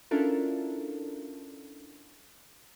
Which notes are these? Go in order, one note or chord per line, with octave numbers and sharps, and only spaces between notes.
C#4 D4 E4 F4 A4 A#4